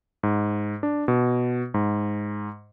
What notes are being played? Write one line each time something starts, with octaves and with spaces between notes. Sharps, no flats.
G#2
D4
B2
G#2